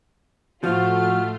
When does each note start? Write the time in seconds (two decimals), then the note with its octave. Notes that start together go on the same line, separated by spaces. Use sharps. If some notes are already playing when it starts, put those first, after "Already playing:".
0.64 A2 F3 A3 F4 F#4 F6